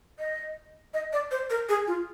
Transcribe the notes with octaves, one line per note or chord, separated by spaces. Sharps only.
D#5
D#5
D5
C5
A#4
G#4
F4